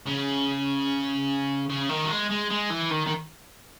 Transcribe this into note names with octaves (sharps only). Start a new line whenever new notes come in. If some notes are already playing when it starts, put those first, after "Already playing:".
C#3
C#3
D#3
F#3
G#3
G#3
G#3
E3
D#3
D#3